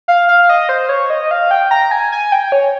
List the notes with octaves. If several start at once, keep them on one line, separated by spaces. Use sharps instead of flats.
F5
F5
D#5
C5
C#5
D#5
F5
G5
A#5
G#5
G#5
G5
C#5